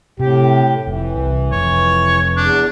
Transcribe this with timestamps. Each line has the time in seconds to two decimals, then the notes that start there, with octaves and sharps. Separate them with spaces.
0.20 A2 C3 G4
0.87 F1 E3
1.16 C2
1.52 F1 F2 C#5
2.37 E2 D4